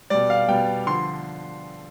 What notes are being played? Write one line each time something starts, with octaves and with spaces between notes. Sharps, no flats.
B2 G3 D5
F5
B2 G3 G5
D3 F3 C6